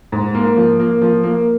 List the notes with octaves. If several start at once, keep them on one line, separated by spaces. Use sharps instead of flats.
G#2
A#3
F3
A#3
F3
A#3